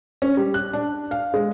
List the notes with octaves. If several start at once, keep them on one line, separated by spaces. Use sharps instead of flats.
C#4
G3
F#6
D4
F5
G#3